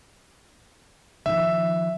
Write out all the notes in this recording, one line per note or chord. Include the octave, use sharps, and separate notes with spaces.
D#3 F3 E5